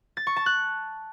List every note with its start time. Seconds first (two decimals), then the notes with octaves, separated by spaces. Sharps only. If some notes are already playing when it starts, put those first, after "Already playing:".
0.17 A6
0.27 C#6
0.36 A5
0.46 F#6